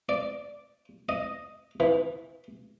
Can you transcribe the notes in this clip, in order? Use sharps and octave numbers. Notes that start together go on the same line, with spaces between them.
D5
D#5
E3